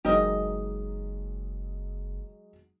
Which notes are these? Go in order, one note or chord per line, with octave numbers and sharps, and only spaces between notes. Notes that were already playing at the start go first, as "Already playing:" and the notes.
F#1 F#3 G#3 D#4 G4 A#4 D#5